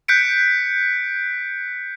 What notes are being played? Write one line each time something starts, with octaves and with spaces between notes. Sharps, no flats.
F#6 G6 B6 C#7 D7